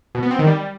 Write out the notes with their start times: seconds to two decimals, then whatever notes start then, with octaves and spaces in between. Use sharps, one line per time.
0.15 B2
0.23 B3
0.31 C4
0.39 D#3
0.47 G3